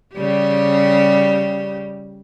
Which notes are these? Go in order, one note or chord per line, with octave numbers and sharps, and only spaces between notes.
C#3 G3 G4